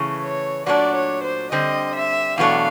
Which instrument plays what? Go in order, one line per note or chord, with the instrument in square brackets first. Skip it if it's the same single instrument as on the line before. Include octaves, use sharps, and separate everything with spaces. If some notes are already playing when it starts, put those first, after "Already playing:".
Already playing: [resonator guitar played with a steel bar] C#3 E3 A3
[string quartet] C#5
[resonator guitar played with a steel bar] A#2 F#3 A3 D4 [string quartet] D5
[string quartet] C#5
C5
[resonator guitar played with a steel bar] D3 G3 C4 [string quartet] D#5
[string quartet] E5
[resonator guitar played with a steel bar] E2 B2 F#3 A3 D4 [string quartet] F5